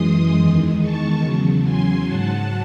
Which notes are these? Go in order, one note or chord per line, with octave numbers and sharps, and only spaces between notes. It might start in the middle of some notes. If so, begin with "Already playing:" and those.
Already playing: F#2 E3 G#3 C6 D#6
E2 D#3 G#3
A5 C#6
E2 C#3 F#3
G#5 C6
G#2 F#3 F#5 A5